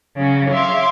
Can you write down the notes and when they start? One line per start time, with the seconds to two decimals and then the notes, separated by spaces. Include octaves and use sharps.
0.16 C#3 F#3 C#4
0.51 C#5 E5 F5 C6 D6